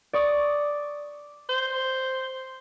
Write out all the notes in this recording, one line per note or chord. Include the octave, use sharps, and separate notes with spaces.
D5 C#6 D#6
C5